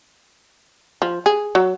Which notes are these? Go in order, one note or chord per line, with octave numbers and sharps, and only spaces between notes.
F3
G#4
F#3